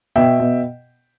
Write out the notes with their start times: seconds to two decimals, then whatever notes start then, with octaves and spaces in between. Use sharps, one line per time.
0.16 B2 E5 G5
0.40 B2